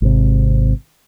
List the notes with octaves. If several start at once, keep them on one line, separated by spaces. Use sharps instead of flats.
G#1 C3